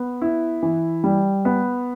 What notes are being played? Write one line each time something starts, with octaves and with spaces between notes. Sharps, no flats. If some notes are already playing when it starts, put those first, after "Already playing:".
Already playing: B3
E4
E3
G3
B3